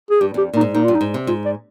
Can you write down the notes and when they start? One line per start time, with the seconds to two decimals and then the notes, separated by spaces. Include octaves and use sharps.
0.11 G#4
0.20 G2 G4
0.34 F2 G4
0.54 A#2
0.56 D#4
0.61 G#2
0.74 A#2 D#4
0.84 G2 F4
0.94 D#4
1.01 G#2
1.14 C3
1.27 G#2 F4
1.46 D5